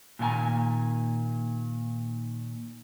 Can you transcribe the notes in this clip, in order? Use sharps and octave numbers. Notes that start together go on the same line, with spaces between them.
A#2 D#3 D4 G#5 A#5